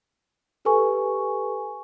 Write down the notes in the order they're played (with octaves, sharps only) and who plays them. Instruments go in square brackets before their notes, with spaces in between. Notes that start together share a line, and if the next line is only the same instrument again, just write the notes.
[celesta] G4 A4 B4 G#5 C#6